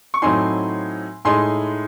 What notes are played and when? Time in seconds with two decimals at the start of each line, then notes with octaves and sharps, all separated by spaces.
0.14 C#6
0.22 A2 F#3 C4 D#4 G#5 C6
1.25 A2 G#3 D#4 G#5 C6